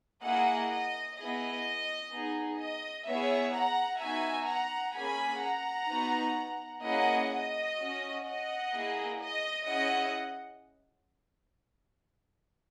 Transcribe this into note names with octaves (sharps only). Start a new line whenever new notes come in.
A#3 E4 G#4 D#5 F#5
D#5
B3 E4 G#4 D#5
B3 D#4 G#4
D#5
B3 E4 G#4 C#5 E5
F#5 A#5
B3 D#4 F#4 E5 G#5
F#5 A#5
A#3 C#4 G#4 G#5 B5
F#5 A#5
B3 D#4 F#4
A#3 C#4 E4 G#4 D#5 F#5
D#5
C#4 F#4
D#5 F#5
A#3 E4 G#4
D#5
C#4 E4 G#4 D#5 F#5